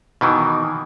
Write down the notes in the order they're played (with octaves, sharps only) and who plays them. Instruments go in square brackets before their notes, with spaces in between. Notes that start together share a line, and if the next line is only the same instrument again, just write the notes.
[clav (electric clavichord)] B2 D#3 E3